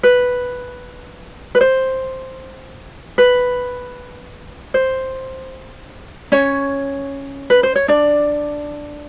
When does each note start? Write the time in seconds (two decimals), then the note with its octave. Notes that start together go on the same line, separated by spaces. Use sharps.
0.03 B4
1.55 B4
1.61 C5
3.18 B4
4.74 C5
6.32 C#4 C#5
7.50 B4
7.63 C5
7.75 C#5
7.88 D4 D5